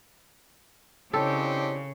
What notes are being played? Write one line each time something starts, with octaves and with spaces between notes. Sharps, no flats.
C#3 C4 D4 E4 G4 A4 C#5 D#5